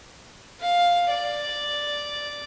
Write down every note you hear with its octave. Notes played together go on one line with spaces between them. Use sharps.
F5
D5